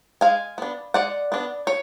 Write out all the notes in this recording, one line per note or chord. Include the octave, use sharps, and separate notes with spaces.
G#3 F5 G#5
B3 D4
G#3 D5 F#5
B3 D4
C#5